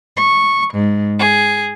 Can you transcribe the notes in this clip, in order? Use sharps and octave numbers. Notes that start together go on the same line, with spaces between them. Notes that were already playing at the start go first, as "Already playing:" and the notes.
C#6
G#2
G#4